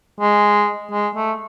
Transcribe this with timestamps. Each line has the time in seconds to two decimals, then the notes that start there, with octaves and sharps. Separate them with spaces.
0.20 G#3
0.91 G#3
1.15 A3